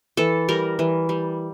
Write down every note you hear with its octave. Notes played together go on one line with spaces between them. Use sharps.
E3 A4
G3 A#4
E3
G3